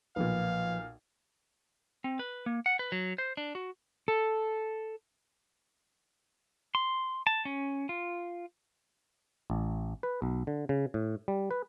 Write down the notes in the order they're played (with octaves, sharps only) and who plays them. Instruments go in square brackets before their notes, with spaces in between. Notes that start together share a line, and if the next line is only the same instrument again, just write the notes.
[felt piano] B1 A#2 [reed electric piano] F3 B4 [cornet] F5
[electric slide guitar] C4
B4
A#3
F#5
B4
F#3
C5
D4
F#4
A4
[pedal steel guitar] C6
A5
C#4
F4
[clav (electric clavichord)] A1
B4
B1
D3
C#3
A2
G3
B4